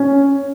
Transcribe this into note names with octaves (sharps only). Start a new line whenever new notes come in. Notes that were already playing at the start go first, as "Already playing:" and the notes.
Already playing: C#4